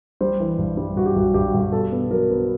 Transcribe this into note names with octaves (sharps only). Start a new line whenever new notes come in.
G3 C5
E3
G2
G3
G2 F#4
G4
G2 F#4
G2 G4
F#4
G2
G4
B2 A4
B3
F#3 A#4
B3